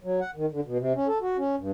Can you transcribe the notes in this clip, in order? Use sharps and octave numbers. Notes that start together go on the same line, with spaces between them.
F#3
F#5
D#3
D3
B2
C3
C#4
A4
F#4
C#4
G2